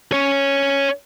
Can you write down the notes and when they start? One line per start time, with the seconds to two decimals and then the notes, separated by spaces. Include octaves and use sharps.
0.12 C#4 C#5